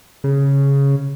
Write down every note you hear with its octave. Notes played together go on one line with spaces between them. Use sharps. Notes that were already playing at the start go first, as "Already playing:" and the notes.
C#3